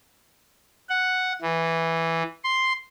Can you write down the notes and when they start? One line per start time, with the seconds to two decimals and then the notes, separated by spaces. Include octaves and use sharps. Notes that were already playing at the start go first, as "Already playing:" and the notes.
0.89 F#5
1.42 E3
2.44 C6